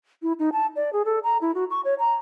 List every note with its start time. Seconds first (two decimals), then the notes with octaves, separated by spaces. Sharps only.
0.22 E4
0.39 D#4
0.53 A5
0.76 D5
0.93 G#4
1.05 A4
1.23 A#5
1.41 E4
1.55 F#4
1.70 C#6
1.85 C#5
1.99 A#5